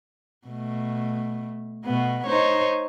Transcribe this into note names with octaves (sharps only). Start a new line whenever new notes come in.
B2 A3
B2 A3 B3
D#4 C5 C#5